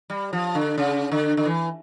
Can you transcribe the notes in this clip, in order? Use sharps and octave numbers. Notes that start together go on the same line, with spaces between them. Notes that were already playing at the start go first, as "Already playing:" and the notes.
G3
F3
D3
C#3
D3
D3
E3